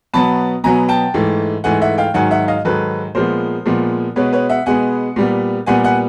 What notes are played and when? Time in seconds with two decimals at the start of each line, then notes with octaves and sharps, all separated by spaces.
0.14 B2 F#3 B3 A5 B5
0.64 B2 F#3 B3 G#5 A#5
0.89 G5 A5
1.14 G#2 E3 A3
1.64 G#2 E3 A3 F#5 G#5
1.81 E5 F#5
1.98 F5 G5
2.14 G#2 D#3 F#3 F#5 G#5
2.31 E5 F#5
2.48 D#5 F5
2.65 G#2 D#3 F#3 A4 B4
3.15 A#2 F3 G#3 B3 A#4 C5
3.66 A#2 F3 G#3 B3
4.16 B2 G#3 B3 B4 C#5
4.33 B4 C#5
4.49 E5 F#5
4.66 B2 G#3 B3 F#5 G#5
5.16 A#2 G3 B3
5.66 A#2 G3 B3 F#5 G#5
5.84 F#5 G#5